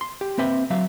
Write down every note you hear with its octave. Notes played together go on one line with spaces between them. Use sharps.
C6
G4
A#3 C4 B4 E5 G5
F#3 E5 F5